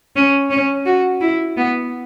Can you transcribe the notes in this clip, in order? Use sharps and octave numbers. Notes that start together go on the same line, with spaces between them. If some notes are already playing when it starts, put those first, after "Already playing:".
C#4
C#4
F#4
E4
B3